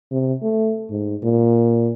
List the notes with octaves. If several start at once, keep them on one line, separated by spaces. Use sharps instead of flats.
C3
A3
G#2
A#2